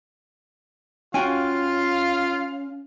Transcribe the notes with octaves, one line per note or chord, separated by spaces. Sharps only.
C#4 F4 F#4 F5 G5 G#5